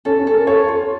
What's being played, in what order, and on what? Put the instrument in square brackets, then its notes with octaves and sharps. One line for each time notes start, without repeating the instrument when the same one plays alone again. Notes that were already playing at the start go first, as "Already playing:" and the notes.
[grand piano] C#4 [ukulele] A4
[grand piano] C#4
[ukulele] A4
[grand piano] A#4
[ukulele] A4 [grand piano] C#5
[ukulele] F4